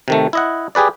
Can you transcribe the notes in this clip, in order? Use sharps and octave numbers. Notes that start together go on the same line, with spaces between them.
C3 D#3 A3
E4 D#5 F#5
G4 G#4 B4 D5